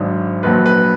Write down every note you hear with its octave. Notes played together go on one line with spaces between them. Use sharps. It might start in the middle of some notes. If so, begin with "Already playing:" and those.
Already playing: G#1 G#2 F#3 D4
A#1 A#2 F#3 B4
B4